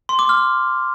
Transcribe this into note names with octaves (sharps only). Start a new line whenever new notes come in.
C6
D6
F6